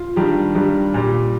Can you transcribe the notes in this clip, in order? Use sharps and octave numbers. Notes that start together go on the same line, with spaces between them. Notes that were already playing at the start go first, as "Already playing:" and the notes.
Already playing: F4
G2 D#3 G3
G2 D#3 G3
A#2 G3